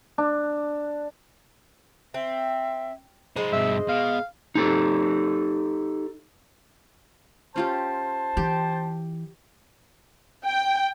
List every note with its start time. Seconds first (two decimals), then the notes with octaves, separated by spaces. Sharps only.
0.18 D4
2.14 C4 E5
3.36 G#3 D#4 B4 C5 D#5
3.53 G2 B2 E5
3.89 B2 F5
4.55 D#4 G4 A4
7.56 C#4 F4 G4 C5 A5
8.37 E3 G4
10.45 G5